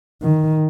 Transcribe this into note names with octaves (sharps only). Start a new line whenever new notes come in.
D#3